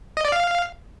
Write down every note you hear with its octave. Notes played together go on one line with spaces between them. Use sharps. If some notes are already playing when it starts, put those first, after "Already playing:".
D#5
D5
F5